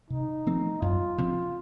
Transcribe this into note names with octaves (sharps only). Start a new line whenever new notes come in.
C3 D#4
F3 A3 C4
F#2 F4
C#3 F3 C4